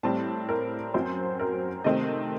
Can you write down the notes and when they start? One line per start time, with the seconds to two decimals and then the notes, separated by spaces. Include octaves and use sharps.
0.03 A2 G3 C4 A5
0.49 A#4
0.94 F#2 F#3 C4 C5
1.39 A#4
1.84 C3 D#3 A3 C4 D#5